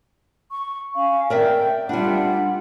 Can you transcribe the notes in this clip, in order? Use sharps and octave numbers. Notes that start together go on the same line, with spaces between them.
C#6
C#4 F5
A#4 D5 E5 G5
G3 D4 F4 F#5 B5